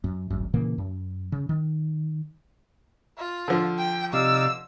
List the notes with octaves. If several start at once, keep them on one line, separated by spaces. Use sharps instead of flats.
F#2
D1 G#1 F#2
A#2 C#3 E3 A#3
F#2
C#3
D#3
F4
D3 F3
G5
C3 D#4 D5 F5 E6